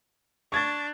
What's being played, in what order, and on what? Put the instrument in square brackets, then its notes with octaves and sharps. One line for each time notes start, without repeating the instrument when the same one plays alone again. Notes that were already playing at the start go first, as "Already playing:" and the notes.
[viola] D4 [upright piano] C#6 G#6 A6